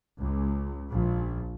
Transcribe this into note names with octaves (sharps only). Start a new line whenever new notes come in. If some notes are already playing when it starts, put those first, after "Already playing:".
C#2
A#1